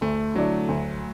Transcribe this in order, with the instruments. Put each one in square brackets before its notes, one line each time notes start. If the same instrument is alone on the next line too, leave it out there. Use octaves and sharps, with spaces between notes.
[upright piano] D2 [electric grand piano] A3
[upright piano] D3 A3 E4 D5 [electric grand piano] F#3
[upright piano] D2